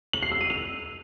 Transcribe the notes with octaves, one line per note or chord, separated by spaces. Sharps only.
F#7
C7
E6
D#7
F7